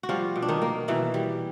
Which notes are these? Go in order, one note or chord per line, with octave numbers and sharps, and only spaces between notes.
F#4
F3 G3 F4
B2
D4
D#3 D#4
A#3
B2 E3 E4
G3